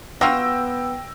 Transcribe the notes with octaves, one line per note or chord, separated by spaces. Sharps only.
B3 F4 F#4 G5 E6 A#6